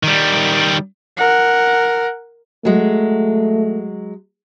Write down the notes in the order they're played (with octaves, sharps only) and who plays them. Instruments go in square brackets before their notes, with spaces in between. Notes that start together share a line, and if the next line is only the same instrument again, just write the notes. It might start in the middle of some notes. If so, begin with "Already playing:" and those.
[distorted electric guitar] D#3 G3
[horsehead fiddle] A#4 F#5
[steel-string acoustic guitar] F#3 G#3 [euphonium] A3